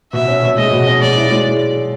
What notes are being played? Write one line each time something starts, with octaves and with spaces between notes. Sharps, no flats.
B2 E5
C#4
B2
G#3 D#5
B2
C#4
G#3 D5
E4
G#3